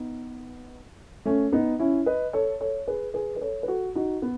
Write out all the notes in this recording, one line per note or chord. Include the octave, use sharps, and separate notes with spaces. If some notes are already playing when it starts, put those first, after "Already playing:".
Already playing: B3 D#4
A3 C#4
B3 D#4
C#4 E4
B4 D#5
A4 C#5
A4 C#5
G#4 B4
G#4 B4
B4
A4 C#5
B4
F#4 A4
D#4 F#4
B3